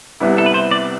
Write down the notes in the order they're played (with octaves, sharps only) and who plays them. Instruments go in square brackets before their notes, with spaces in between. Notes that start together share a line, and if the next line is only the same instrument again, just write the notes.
[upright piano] C2 C3 G3 B3 E4
[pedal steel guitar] A4
B4
C5
D5